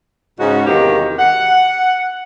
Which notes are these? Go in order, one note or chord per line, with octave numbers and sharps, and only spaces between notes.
G#2 C#3 C#4 D#4 F#4
E2 C3 D#3 A#3 F#4 G4
F#5